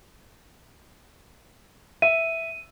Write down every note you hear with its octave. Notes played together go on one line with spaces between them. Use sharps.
E5 D#7